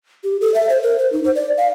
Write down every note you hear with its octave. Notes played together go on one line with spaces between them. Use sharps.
G4
A4
E5
C5
A#4
C5
D#4
C5
D5
F5